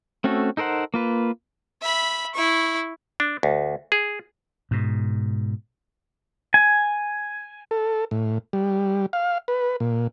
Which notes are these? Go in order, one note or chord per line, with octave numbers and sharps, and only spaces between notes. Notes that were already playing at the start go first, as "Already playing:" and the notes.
A3 C4 C#4 F#4 A4
D#4 A4 A#4 C5 F#5
A#3 F4 B4
E5 B5
E4 C#6
D4
D2
G#4
G#2 B2
G#5
A4
A2
G3
F5
B4
A#2